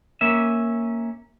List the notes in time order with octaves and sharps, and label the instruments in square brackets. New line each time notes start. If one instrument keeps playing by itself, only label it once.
[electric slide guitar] A#3 C#4 E5